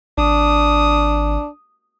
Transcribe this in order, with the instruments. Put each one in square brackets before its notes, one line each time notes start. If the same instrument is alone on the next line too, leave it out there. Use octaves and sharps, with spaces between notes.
[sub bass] G#1 [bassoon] D4 [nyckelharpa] D#6